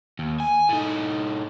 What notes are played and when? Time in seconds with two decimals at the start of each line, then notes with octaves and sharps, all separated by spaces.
0.19 D#2
0.40 G#5
0.69 A2 D#4